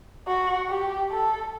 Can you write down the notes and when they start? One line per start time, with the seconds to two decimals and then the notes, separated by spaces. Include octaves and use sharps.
0.28 F#4
0.69 G4
1.11 A4